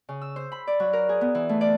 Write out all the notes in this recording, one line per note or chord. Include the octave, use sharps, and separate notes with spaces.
C#3
E6
C5
B5
D5
F#3
A#4
G#4
B3
E3
A3
D5